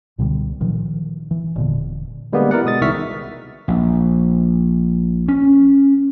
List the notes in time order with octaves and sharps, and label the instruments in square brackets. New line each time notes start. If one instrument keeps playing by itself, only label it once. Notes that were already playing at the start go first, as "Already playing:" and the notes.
[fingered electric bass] C#2 B2 D3 G3
A#2 D#3 F3 F#3
E3
E1 A#2 D3
[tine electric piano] D3 G3 G#3 A#3 B3
E4 A#4 D5 F#5
B2 G#3 D#6 A6
C2 D#3 E5 C#6 F6 B6
[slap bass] A#1
C#4